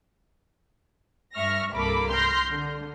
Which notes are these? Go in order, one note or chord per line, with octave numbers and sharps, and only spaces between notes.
G2 E5 C#6 F6 A#6
C2 G2 A#3 A4 B5 D6
C6 F6 G6 A#6 C7
D3